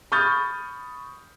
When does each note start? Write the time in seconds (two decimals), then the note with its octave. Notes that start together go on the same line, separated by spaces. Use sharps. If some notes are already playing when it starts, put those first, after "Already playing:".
0.12 B5 C#6 D#6 F6 G6 A6